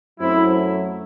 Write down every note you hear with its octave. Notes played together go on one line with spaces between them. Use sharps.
F#2 F#3 A3 C4 E4